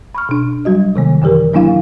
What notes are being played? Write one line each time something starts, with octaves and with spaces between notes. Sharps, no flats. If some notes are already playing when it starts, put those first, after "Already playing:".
B5 C#6 F6
B2 D4
F#3 G3 F#4 D#5
C3 D#3 A#3
F#2 D3 E3 G4 A#4
F#3 A#3 D4 E4 F5